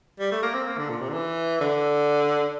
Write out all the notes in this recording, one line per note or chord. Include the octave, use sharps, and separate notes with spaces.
G3
A3
A#3
C4
A#3
D3
A#2
C3
D3
E3
D3